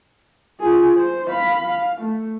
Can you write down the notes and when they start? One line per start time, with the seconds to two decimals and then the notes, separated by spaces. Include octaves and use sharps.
0.60 F4 G#4
0.97 C5
1.30 F5 B5
1.68 F5
2.01 A3